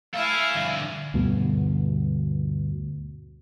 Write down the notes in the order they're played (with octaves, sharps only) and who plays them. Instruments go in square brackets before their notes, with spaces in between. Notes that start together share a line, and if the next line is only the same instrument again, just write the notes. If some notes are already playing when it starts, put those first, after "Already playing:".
[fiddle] E4 G#5 [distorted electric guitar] A4 E5 [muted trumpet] F5
[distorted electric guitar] D2 G2
[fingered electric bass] D2 G2 B2